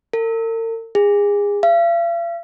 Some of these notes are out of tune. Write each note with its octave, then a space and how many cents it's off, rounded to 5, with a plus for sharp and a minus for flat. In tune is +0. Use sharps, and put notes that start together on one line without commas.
A#4 -45
G#4 -25
F5 -45